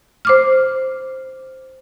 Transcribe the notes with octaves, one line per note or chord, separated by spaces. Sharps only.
C5 D6 F6